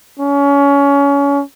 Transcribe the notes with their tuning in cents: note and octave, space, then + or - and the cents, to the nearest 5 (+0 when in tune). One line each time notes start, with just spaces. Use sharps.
C#4 +25